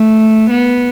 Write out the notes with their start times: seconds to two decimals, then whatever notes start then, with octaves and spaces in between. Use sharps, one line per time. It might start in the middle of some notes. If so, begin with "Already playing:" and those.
Already playing: A3
0.50 B3